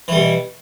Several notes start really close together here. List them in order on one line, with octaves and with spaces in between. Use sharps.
E3 G3 B2